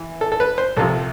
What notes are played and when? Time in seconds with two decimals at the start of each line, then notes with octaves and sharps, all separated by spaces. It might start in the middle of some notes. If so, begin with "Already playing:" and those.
Already playing: E3
0.21 A4
0.32 A4
0.40 B4
0.58 C5
0.77 C2 C3 F3 A4